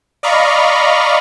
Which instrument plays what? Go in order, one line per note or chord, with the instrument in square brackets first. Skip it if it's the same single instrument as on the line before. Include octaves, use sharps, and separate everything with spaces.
[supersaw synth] D5 D#5 F5 A#5 B5 C#6